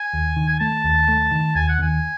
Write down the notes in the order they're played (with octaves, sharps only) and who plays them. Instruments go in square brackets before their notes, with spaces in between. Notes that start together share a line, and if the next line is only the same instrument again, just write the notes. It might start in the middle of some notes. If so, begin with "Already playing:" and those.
Already playing: [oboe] G#5
[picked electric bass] D#2
D#3
[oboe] G#5
[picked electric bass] A3 [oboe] A5
[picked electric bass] D#2
A3
D#3
[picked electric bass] D#2 [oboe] G#5
[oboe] F#5
[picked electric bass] D#2 [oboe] G#5